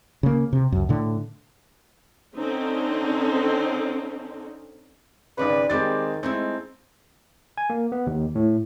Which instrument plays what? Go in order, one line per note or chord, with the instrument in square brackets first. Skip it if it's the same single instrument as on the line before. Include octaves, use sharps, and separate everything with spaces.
[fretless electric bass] C#3 A#3
C3
C#2 F#2
A2 D3
[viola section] D3 C4 C#4 D#4
[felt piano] G#1 C#3 [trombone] B4 [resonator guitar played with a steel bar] C#5 D5
[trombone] D#3 [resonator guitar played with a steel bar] G3 G4 [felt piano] G#3 C4 A6
[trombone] G#3 [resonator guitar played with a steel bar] A3 D#4 E4 [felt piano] C4
[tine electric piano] G#5
A#3
B3
D#2
A2